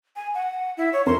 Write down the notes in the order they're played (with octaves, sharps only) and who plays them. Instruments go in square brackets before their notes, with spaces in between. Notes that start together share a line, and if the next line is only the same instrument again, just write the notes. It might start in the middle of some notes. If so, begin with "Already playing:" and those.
[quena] G#5
F#5
E4
C#5
[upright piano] F2 A#4 A#5 [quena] C6